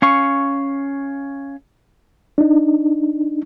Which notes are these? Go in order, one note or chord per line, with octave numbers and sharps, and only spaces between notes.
C#4 F5 C#6
D4 D#4